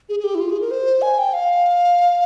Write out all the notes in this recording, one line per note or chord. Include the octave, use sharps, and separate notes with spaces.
G#4
G#4
G4
E4
F4
G#4
A#4
C5
G#5
G5
F5